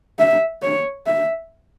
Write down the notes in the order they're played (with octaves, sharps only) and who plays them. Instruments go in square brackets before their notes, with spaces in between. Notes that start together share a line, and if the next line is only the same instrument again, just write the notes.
[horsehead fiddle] E5
C#5
E5